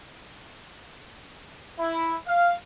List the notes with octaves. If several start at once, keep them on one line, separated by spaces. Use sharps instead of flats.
E4
F5